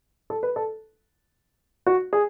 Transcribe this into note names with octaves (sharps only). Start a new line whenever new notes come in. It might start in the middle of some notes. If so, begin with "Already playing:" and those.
A4
B4
A4
F#4
G#4